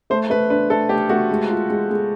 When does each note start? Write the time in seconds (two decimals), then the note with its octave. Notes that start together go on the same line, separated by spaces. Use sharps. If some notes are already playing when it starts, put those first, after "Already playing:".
0.10 A3 C5
0.30 A3 B4
0.50 D4 B4
0.70 A3 A4
0.89 A3 G4
1.09 A3 F#4
1.29 G#3
1.50 F4
1.69 G#3
1.90 G#3